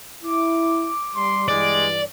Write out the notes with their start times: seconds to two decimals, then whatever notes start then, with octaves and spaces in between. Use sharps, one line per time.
0.24 E4 D6
1.15 G3 C6
1.48 G2 E3 G#3 D5